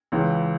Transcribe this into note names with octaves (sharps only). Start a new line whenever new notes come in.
C#2 C#3 E3